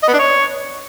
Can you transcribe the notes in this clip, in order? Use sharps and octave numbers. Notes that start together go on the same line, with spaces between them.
D#5
B3
D4
C#5